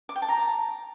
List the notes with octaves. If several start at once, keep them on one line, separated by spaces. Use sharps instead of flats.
D6
G5
A5
A#5